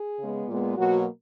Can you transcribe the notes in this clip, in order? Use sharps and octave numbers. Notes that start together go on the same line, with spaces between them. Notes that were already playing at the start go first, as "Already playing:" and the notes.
Already playing: G#4
C#3 G#3 B3
A#2 G#3 B3
B2 F#3 A#3 F#4